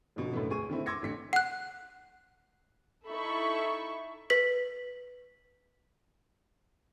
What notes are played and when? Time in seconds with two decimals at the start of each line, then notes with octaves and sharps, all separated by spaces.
0.16 D#1 B2 D3 F3
0.32 F#2 A2 D3 A3 B3
0.50 D2 G#4 C#6 D#7
0.70 D3 D#3 A3 C4 E4
0.86 C6 D6 E6 G#6 A#6 C#7
1.02 A1 D3 B6 C#7
1.33 F#5 F#6
3.08 D#4 E4 A4 E5 B5 C#6
4.30 B4 B6 F#7